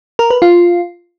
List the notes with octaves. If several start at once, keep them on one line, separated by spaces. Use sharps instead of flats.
A#4
B4
F4